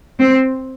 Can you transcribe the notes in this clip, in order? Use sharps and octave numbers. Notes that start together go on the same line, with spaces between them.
C4